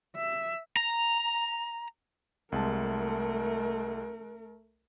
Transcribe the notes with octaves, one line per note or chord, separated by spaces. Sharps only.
E5
A#5
C2 G#3 A3 A#4 A5